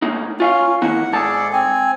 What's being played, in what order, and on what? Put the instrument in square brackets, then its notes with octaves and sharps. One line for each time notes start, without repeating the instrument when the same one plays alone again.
[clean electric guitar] A2 A#3 D#4
[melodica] C#4 [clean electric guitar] F4 E5 F5
[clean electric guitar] D#3 A#3 E4 [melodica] F#5
[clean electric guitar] G#2 A5 [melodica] G#4 A4 D5
[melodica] C4 G#5